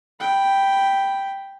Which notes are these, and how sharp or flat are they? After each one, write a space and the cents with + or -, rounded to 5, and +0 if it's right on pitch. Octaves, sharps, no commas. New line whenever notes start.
G5 +0 B5 +0